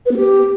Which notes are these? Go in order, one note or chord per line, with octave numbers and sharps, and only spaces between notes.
B4
B3
G4